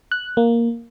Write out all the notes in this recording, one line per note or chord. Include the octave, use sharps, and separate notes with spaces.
F#6
A#3